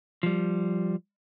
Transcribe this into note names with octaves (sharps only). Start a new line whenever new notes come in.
F3 G3